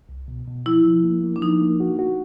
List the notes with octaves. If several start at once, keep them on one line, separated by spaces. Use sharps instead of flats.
C2
B2
B2
F3 E4
F3
A#3
A#3
D4
F3 D#4
A#3
F#4
F#4